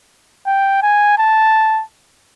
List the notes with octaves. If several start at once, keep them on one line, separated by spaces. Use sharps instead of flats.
G5
G#5
A5